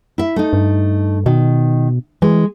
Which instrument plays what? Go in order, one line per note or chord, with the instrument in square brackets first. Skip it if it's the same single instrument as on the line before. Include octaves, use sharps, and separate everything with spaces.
[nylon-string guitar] E4 E5
A3 D#4
[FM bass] G2
[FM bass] B2 [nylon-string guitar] D#3
[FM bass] E3 [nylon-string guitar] G#3